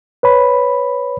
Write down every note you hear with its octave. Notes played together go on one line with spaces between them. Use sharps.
B4 C#5 B5